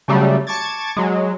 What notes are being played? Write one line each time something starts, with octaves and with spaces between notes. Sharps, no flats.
C#3 F#3 G3 A3
A5 C#6 D6 G#6 A6
F#3 G#3